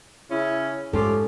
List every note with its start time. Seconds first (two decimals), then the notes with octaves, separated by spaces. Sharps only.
0.30 C#3 C#4 E4
0.93 G#2 F3 C#4 F4 G4 A4